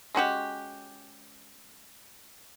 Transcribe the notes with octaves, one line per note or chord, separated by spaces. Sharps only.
G#3 C#4 F#4 G4